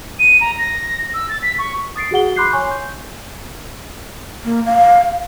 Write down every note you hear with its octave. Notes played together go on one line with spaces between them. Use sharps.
D#7
A#5
A#6
E6
A6
B6
C#6
D#6 A6 C7 D7
F#4 G#4 F#5 G7
B5 C6 D6 F#6 G6 C7
C#5 G#5 C#6
G6
A#3
F5